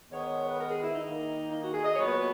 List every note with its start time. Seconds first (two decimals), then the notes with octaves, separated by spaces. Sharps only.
0.12 D#3 G#3 B3 C#5
0.19 D#5
0.24 C#5
0.35 C#5
0.47 B4
0.58 A#4
0.70 G#4
0.81 E4
0.93 D#4
1.04 D#3 A#3
1.49 D#4
1.61 F#4
1.73 G#4
1.84 D#5
1.95 A#2 F#3 B3 C#5
2.07 B4
2.18 C#5